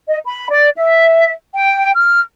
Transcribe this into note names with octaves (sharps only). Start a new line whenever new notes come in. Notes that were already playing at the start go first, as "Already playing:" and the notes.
D#5
B5
D5
E5
G5
F6